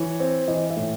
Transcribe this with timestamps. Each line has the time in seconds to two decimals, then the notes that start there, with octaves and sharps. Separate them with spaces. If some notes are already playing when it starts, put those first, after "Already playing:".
Already playing: E3 C#5
0.20 C4
0.48 E3 D#5
0.70 E5
0.76 A2